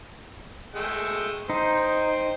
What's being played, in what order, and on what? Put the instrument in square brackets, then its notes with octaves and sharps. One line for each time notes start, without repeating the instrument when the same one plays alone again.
[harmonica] G#3 A3 G5
[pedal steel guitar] D#4 [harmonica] C5 G5